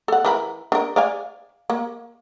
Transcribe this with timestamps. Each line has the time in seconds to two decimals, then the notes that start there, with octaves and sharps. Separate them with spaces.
0.08 A4 F#5
0.25 E3 A#4 B5
0.72 D4 A#4
0.96 D5 F5 G#5
1.70 A#3